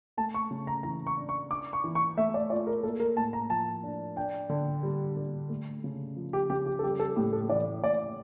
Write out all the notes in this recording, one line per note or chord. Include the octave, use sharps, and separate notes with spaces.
A3 A5
C#6
C#3
A#5
E3 A#5
C#6
D4
C#6
D4 D6
C#6
E3
C#6
A3 E5
D5
F4 D5
A#4
A#3 A4
A#4
A2 A5
A#5
F3 A5
D4
D4 G5
D3
G3
D3
A3
C#3
F3
G4
C#3 G4
G4
A4
G3 G4
A4
A2 G4
A4
E3 D5
A2 D5